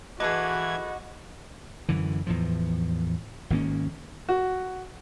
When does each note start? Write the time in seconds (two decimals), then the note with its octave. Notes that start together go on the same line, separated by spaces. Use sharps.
0.20 E3 F#4 G#4 A4 B4 D#5 D6 G#6
1.89 F#2 D3 E3
2.27 E2 A2 F3
3.50 G#1 D#3 A#3 C#4
4.29 F#4